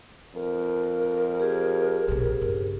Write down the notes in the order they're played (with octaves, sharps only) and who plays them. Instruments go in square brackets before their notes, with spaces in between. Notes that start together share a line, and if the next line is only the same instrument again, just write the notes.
[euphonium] F2 [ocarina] A#4
[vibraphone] G4 G#4 C5
[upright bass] A#1 B2
G1 C#3